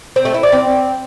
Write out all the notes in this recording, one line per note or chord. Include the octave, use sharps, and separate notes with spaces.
C4
A3
E4
D5
C4